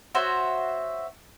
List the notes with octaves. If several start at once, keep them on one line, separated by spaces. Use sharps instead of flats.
F#4 C5 C#5 E5